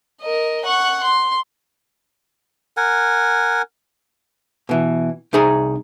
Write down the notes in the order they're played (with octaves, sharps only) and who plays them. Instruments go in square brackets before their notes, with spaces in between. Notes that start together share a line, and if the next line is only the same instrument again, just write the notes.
[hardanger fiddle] A#4 D#5
F#5 C#6
C6
[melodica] A#4 F#5 G#5
[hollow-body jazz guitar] B2 E3
C2 D#4 G#4 A#5